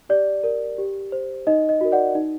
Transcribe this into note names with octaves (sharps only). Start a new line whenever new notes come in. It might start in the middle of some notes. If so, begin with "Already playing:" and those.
G4 D5
A#4 D5
G4
C5
D#4 D#5
D#5
F#4 A#4
D5 F#5
D#4